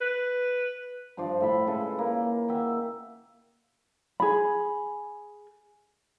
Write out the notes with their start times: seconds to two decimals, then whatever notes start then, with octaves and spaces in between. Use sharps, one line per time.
0.01 B4
1.17 G2 F3 C5 D5
1.41 A2 E5 B5 C6
1.67 C#3 G#3 A4 B4
1.99 A#3
2.48 D#5 E5 F#5 G5
4.20 G#4 B5